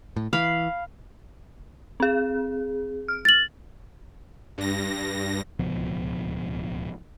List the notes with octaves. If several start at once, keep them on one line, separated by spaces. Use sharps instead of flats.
A2
E3 F5 B5
C4 G#4
F6
A6 F#7
G2 A#6
D1 C#2 B2 F3